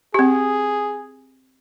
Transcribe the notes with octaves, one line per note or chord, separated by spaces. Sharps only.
C4 G4 G#4